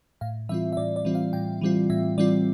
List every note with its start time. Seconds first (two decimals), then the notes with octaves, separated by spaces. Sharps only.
0.21 A2 F5
0.49 E3 G3 C4 F4 E5
0.73 E5
0.77 A2 D5
0.96 D5
1.05 E3 G3 C4 F4
1.15 F5
1.33 A2 G5
1.61 E3 G3 C4 F4
1.90 A2 E5
2.18 E3 G3 C4 F4 D5